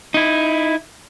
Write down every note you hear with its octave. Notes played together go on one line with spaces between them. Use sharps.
D#4 E4